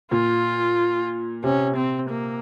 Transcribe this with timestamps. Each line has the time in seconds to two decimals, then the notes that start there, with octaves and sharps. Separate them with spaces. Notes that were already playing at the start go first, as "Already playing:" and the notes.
0.11 A#2 F4
1.44 C3 C#4
1.76 C4
2.10 A#3